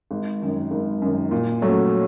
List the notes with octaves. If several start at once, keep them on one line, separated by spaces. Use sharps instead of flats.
G#1
F#2 D#3
G#1
F#2 D#3
A#2
F#3 A3 C#4